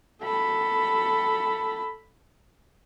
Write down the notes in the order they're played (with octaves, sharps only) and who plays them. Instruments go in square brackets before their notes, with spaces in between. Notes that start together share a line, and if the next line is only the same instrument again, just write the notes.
[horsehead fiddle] A4 B5